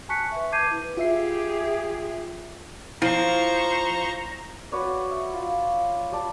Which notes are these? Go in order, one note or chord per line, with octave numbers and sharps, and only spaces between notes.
G#5 A5 C#6 F#6 B6 C#7
B4 E5
A5 D6 G6 G#6 C7 D#7
E4 B4
F4 G4 G#4 E5 C7
F3 E4 C5 A#5 C#6
F#4 B4 C#5 D5
E5
F4
G3 D5 A5